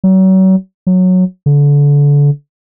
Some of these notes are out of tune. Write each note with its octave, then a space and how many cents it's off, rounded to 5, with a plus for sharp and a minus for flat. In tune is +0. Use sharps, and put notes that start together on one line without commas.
F#3 +35
F#3 -10
D3 -30